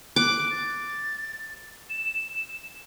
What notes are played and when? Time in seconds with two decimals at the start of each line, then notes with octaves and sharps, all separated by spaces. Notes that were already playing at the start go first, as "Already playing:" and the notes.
0.16 D6 F#6
0.51 A6
1.90 E7